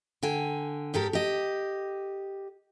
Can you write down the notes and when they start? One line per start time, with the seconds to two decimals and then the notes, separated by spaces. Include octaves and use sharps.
0.23 D3 G5 G#5
0.94 G#2 G4 A4 A#4
1.13 G4 D#5